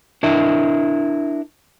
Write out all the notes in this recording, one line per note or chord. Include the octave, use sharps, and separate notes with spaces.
D4 E4 A#4 E5